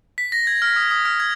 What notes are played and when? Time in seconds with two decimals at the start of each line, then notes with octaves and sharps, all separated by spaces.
0.18 B6
0.32 A#6
0.47 G#6
0.62 F6
0.76 D#6
0.91 D#6
1.05 F6
1.20 G#6